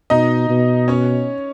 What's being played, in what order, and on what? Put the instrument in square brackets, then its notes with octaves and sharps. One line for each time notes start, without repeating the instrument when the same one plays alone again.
[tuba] B2 [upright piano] D#4 D#5
[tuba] B2
[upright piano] C#4 C#5